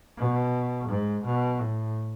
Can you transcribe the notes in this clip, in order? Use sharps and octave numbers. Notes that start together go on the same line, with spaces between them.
B2
G#2
B2
A2